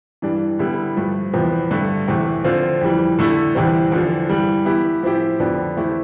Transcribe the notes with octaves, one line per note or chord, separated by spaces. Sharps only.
G2 E3 G3 D4
D3 G3 B3 E4
G2 F3 A3
E2 C3 F3 B3
G2 D3 A3
E2 C3 E3 A3
D3 F3 C4 F4
F2 E3 G3
D3 A3 E4
E2 C3 E3 G3 C4
E2 D3 F3
G2 E3 G3
E3 B3 E4 G4
A2 F3 C4 E4 G4
F2 D3 F3 B3 D4
E3 A3 C4 E4 G4